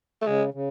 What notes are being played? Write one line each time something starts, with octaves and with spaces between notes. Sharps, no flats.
A3
C#3 G#3
C#3